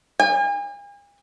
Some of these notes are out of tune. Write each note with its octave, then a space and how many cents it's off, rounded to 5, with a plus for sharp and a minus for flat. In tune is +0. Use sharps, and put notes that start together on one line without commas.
G#5 -40